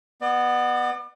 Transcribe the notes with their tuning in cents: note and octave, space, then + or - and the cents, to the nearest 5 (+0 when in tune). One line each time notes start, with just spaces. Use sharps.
B3 +0 D5 +40